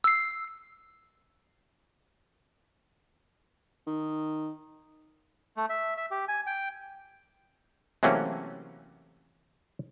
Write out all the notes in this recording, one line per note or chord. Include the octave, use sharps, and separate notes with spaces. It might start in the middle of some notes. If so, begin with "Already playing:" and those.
E6 C7
D#3
A3
E5
E5
G4
G#5
G5
C3 E3 F#3 A3 A#3 C#4